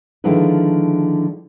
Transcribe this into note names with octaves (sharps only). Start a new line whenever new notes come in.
D3 D#3 F3 G#3 E4 B4